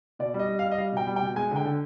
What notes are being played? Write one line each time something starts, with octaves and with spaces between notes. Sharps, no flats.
B2 D5
G3
D#5
G3
G3 F5
D#5
G3 F5
B2 G5
G3
G5
B2
G#3 G#5
D3 G5
D3